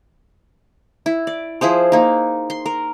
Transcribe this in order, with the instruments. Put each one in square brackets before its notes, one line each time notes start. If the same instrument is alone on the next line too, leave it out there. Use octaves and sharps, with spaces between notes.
[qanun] E4
D5
F3 E4 G#4 C5
A#3 D#4
C6
A#4